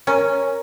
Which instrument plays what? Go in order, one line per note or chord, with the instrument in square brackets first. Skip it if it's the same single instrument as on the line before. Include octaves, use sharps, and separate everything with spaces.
[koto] C#4 [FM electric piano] A#4